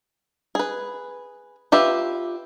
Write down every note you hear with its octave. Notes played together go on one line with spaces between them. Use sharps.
G#4 B4
F4 G4 B4 E5